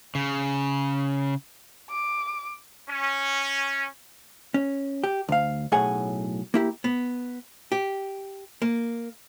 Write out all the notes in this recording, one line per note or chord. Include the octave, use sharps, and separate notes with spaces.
C#3
D6
C#4
C#4
G4
D2 F5
B1 A2 G#4 C#5 F#5 G#5
A#3 E4 G4
B3
G4
A#3